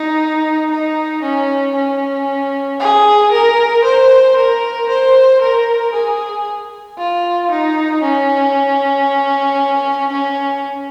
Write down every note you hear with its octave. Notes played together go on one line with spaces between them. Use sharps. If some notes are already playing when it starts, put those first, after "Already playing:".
Already playing: D#4
D#4
C#4
C#4
G#4
A#4
C5
A#4
C5
A#4
G#4
F4
D#4
C#4
C#4